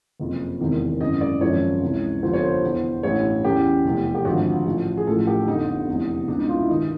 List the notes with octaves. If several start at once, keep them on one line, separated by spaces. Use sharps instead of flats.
F#1 F2 C3
E1 E2 C3 D#3
G#1 F#2 C#3 E3 D#5
D5
G#1 F#2 C#3 F3 C#5
C#2 C3 E3
G1 F2 D3 F3 C5
C#5
C5
E2 B2
A1 G2 E3 C#5
E2 C#3 E3 G4
F1 E2 B2
G4
G#1 G2 D3 F3 F#4
A1 A2 F3
G#4
A1 A2 F3 A4
G4
D4
G1 F2 D3 D#4
F1 E2 C3 E3
C#2 B2 D4
D#4
F4
E4
G2 D#3 D#4